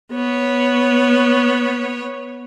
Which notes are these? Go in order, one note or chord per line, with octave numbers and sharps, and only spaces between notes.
B3 C#5